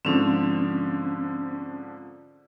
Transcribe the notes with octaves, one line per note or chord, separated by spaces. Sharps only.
G#2 D3 F3 C4 C#4